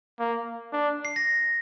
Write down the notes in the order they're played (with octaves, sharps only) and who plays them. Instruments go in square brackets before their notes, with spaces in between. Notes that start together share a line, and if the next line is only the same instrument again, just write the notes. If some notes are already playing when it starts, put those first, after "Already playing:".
[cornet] A#3
D4
[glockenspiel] C7
A#6